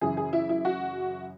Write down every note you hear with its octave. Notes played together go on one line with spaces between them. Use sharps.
F#2 C#3 E3 G#4
G#4
E4
E4
F#4